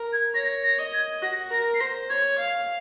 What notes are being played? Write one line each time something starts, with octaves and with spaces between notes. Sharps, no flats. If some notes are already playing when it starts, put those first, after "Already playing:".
Already playing: A#4
G#6
C#5 A#6
A#6
D#5
G#6
F#4 A#6
A#4 A#6
C7
C5 A#6
C#5 G#6
F5